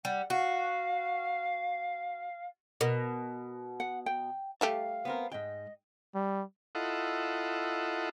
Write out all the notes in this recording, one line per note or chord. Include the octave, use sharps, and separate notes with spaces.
G3 F#5
F#4 F5
B2 A#4
F#5
G5
G3 A3 G4 F5 A5
B3 C4 A#4
G#2 D#5 G5
G3
E4 F4 A4 D#5 F#5